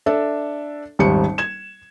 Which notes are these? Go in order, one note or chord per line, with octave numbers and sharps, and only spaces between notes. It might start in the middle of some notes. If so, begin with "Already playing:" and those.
D4 A4 E5
D#1 G#1 G3 C#7
G#6 E7